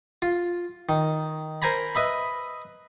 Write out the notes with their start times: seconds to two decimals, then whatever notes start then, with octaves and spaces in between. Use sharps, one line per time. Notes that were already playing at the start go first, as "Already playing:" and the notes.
0.22 F4
0.89 D#3
1.62 A#4 C5 G#5 A#5 B5
1.95 B4 D#5 E5 B5